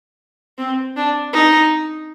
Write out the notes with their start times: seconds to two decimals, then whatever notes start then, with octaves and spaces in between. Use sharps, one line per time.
0.58 C4
0.96 D4
1.33 D#4